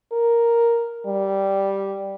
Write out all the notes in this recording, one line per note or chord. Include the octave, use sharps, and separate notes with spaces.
A#4
G3